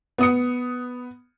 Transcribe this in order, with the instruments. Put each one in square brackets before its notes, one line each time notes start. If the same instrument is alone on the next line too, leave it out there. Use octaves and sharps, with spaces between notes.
[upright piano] B3 D#6 C#7